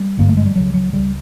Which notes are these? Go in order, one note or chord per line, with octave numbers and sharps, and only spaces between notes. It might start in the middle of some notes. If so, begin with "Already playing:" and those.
Already playing: G3
G#1 G2 D3 A#3
A3
G#3
G3
C#2 C#3 F#3
F#3
C#2 C#3 G3